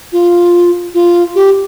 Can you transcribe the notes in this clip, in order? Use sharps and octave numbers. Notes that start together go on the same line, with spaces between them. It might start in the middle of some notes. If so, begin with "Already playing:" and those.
F4
F4
G4